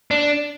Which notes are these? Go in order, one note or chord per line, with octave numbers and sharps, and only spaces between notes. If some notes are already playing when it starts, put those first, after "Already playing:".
D4